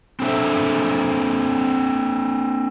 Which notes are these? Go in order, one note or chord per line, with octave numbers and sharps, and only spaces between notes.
C4 D4 A4 A#4 C5 E5